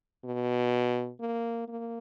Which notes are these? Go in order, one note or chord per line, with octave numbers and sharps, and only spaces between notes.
B2
A#3
A#3